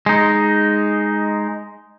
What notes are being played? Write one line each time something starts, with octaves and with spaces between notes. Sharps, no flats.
G#3 D#4